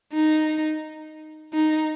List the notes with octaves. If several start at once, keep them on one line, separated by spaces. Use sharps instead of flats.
D#4
D#4